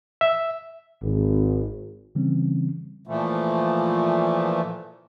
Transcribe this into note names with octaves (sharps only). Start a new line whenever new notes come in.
E5
G#1
C#3 E3 G3 C4 C#4
A#2 E3 F3 A3